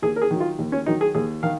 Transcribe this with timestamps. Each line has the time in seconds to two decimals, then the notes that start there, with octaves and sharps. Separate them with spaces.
0.02 D#2 G#4
0.16 A#4
0.22 G#4
0.31 D#3 F#3
0.40 F4
0.59 D#2
0.72 C#4
0.86 D#3 F#3 D#4
1.01 G#4
1.15 D#2 G#4
1.43 D#3 F5